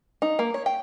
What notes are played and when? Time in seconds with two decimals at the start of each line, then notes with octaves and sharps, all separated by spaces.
0.22 D#4
0.39 A#3
0.54 C#5
0.66 G5